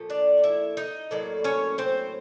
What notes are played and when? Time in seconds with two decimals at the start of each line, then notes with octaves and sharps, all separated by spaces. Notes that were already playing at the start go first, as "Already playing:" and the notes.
Already playing: A#2 F3 A3
0.10 D4 D5
0.44 E4 E5
0.77 D#4 D#5
1.11 A2 F#3 A#3 D5
1.44 C#4 C#5
1.78 C4 C5